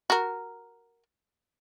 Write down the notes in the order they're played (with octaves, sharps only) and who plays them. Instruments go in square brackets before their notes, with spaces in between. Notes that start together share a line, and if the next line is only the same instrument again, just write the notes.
[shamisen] F#4 A#4